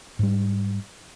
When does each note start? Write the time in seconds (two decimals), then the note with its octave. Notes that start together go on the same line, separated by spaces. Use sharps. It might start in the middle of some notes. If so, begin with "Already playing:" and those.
0.19 G#2 G3